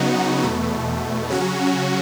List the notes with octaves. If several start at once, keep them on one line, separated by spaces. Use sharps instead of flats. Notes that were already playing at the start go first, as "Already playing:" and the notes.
Already playing: C#3 F#3 B3 D#4 F#4
E2 B2 A3
C#3 F#3 C#4 F#4